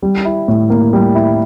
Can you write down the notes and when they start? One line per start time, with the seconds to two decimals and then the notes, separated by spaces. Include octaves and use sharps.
0.02 G3
0.25 E4
0.48 A2
0.70 A#3
0.93 G3
1.15 E4